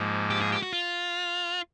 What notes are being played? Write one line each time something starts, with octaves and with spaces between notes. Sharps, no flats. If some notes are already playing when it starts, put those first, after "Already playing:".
Already playing: G#2 F3 A#3
G4
G#4
G4
F#4
F4